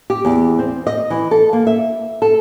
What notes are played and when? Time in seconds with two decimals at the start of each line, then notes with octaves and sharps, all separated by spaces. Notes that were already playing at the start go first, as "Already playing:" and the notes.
0.10 G4
0.25 E2
0.59 C4
0.87 D#5
1.10 E3
1.31 A4
1.53 A#3
1.67 E5
2.22 A4